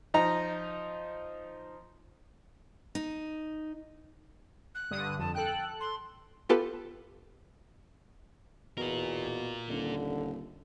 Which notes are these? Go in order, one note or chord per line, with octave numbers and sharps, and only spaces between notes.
F3 D#4 A#5
D#4
F#6
G2 D3 D#6
F2 A5
A4 G5 F#6
C6
B3 F4 G4 A4 B4
E2 B2 F4 A#4
D#1 D3